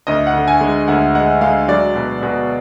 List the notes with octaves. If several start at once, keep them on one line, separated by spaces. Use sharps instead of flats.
D2 D#5
F#5
D3
G#5
G#3
D2 F#5
G#3 F#5
G#3 F5
F#3 D5
B2
B2